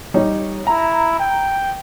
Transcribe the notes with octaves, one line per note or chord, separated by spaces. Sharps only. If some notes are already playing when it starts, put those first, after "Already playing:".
G3 D#4 C#5
E4 A#5
G5